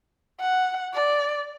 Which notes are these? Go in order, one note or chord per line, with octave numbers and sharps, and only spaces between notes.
F#5
D5